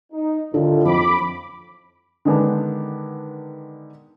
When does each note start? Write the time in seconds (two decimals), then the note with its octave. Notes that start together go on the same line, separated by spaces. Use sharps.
0.13 D#4
0.54 D#2 A2 D3 F4
0.85 F2 B5 D6
2.25 D3 D#3 G#3 B3 D4